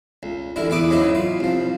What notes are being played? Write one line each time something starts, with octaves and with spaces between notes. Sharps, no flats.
C#2
A1 D3 E4 A#4
E2 E4 B4 D6 D#6
G#2 C#3 F#3 D#4 E4
F4
C2 F3